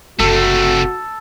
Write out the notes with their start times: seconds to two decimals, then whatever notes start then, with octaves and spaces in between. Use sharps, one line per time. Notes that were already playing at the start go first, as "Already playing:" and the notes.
0.19 F#1 C3 A3 F#4 A4